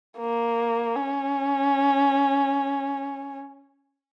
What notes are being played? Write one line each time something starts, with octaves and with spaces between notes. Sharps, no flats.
A#3
C#4